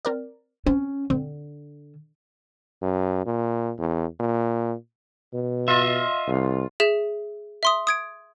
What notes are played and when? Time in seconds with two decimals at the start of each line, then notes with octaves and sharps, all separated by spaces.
0.05 C4 A#4 D5
0.66 C4 C#4
1.10 D3 C4
2.82 F#2
3.26 A#2
3.79 E2
4.20 A#2
5.33 B2
5.68 F4 D#5 E5
6.27 C2
6.80 G#4 E5 E7
7.63 E5 C6 D#6
7.87 D#6 G#6 D7